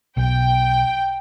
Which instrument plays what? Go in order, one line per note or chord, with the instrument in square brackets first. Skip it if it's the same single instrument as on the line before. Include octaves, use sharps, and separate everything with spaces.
[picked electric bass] B1 [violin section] G5